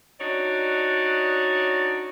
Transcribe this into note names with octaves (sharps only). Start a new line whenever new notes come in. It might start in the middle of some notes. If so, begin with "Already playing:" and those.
D4 D#4 F#4 C#5 D5